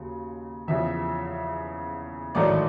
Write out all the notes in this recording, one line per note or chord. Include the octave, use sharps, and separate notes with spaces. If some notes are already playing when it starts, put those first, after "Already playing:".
Already playing: D#2 C#3 F#3
E2 C#3 F3 E5
A1 G#2 D#3 F#3 A3 D5